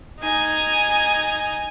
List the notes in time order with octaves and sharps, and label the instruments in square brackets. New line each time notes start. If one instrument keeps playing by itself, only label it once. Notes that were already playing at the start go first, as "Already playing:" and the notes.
[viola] D#4 G#5